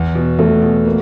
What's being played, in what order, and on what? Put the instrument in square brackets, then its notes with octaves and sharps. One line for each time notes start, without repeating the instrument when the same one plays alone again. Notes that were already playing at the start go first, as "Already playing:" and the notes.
Already playing: [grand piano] E2
B2
[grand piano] E2 [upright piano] A3 A4
[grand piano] B2
A#3